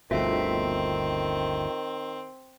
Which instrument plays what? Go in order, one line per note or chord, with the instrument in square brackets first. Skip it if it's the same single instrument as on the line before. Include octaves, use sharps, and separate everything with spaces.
[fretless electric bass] G1 D2 B2 [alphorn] D#3 [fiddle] C4 [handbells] F4 A4 E5